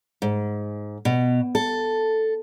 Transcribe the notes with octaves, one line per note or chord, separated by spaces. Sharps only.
G#2
B2
A4